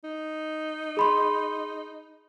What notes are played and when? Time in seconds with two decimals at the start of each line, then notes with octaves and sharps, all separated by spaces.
0.04 D#4
0.97 G#4 B5 C6